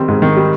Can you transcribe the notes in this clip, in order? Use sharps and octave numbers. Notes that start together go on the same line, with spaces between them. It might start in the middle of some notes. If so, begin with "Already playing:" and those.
Already playing: D#3 G3 C4
G#2
D#3
G3